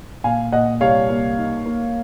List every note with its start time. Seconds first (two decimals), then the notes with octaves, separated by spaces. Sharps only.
0.24 A#2 F5 G#5
0.52 A#2 D#5 F#5
0.81 C2 C#5 F5
1.10 A#3
1.38 D#4
1.66 A#3